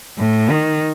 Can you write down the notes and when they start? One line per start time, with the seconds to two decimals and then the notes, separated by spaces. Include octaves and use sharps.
0.18 A2
0.50 D#3